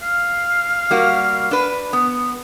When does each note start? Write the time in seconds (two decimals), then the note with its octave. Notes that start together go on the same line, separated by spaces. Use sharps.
0.02 F5
0.91 G3 A#3 F#4
1.51 D4 B4
1.93 B3